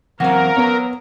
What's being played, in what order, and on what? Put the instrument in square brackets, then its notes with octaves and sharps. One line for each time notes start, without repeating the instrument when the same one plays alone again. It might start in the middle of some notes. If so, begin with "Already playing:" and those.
[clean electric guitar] E3 F#3 C4 [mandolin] F#4 F5 [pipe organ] A#4
[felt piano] B3 [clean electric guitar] C#5 A#5